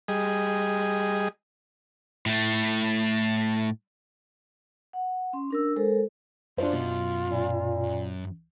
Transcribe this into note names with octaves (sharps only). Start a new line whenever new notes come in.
G3 G#4 D#5
A2 A3
F#5
C#4 C6
D4 A#4 E6
G#3 A4 A#4 C5
F#2 F#3 D4 F4 C5
B2
A#2